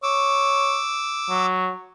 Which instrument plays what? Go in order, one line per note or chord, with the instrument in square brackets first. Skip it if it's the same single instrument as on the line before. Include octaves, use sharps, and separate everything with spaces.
[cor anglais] C#5 [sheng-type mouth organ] D6 E6
[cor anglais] F#3